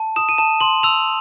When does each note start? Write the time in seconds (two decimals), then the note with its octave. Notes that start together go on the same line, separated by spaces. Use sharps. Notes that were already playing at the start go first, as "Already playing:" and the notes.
Already playing: A5
0.16 D#6 E7
0.29 D#7
0.38 A5 E7
0.60 C6 F#7
0.83 E6 F7